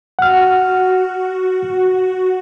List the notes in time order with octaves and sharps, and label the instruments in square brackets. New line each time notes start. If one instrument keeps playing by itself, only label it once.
[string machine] F#4 [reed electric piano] F#5 F6